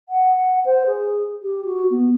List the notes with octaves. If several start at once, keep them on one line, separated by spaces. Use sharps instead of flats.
F#5
C5
G#4
G4
F#4
B3